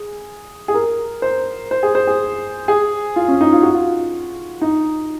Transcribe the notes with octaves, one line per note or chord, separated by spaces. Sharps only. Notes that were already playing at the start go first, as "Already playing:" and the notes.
Already playing: G#4
G#4
A#4
C5
C5
G#4
C5
G#4
G#4
F4
C#4
D#4
F4
F#4
F4
D#4